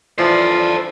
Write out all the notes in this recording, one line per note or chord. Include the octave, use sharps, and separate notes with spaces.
E3 F3 D4 A4 C5 D5